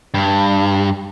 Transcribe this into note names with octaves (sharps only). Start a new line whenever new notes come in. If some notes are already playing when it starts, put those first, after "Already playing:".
G2